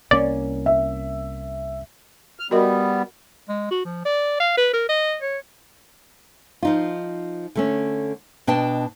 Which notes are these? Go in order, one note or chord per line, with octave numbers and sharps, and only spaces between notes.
C2 A#3 C#4 D5
E5
F6
G3 B3 F#4 A#4 D#5
G#3
F#4
F3
D5
F5
B4
A#4
D#5
C#5
F3 D#4 F4
D3 A3 C#4
B2 D4 D#5 G5 A5